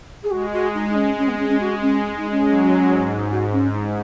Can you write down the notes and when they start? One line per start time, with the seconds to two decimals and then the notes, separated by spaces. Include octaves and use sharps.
0.24 G#4
0.31 G#3 F#4
0.53 F#4
0.74 G#3 D#4
0.89 D#4
0.95 C#4
1.18 C#4
1.28 B3
1.39 C#4
1.49 C#4
1.60 F#4
1.81 C#4
2.02 G#3
2.17 D#4
2.31 C#4
2.45 F#3
2.88 G#2
3.31 F#4
3.52 C#4
3.74 D#4